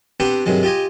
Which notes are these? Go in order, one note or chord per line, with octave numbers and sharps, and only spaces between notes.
B3 C4 D4 G4 C5 F#5
G2 C3 D#3 F#3 G#3
F4 G4 D#5 G#5